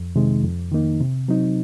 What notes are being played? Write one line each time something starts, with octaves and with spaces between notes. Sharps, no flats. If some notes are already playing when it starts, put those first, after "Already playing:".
Already playing: F2
C3 D#3 G#3 D#4
F2
D#3 A#3 D#4
C3
F#3 C4 D#4